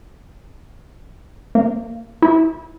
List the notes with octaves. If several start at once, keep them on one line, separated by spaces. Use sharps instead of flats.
A#3
E4